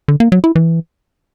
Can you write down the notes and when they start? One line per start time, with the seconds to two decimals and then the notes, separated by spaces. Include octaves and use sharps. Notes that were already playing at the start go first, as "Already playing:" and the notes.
0.08 D3
0.20 A#3
0.32 F#3
0.44 E4
0.56 E3